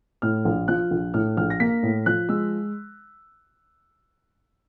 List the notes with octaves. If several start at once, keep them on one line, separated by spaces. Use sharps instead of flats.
A2 F6
A#1
F3 F#6
A#1
A2 F6
A#1 F6
A#6
A#3 B6
A2
F3 F#6
G#3 E6